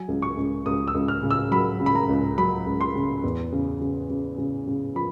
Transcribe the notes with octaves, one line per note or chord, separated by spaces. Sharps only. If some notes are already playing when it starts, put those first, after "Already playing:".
Already playing: F#3 G#5
C#2
C#6
C#2
C#2 D#6
E6
C#2
F6
C#3
E6
F#3 B5
C#3
B5
A#5
C#2
F#3 B5
C#2
C6
C#3
E2
C#3
C#3
C#3
C#3
C#3
F3 B5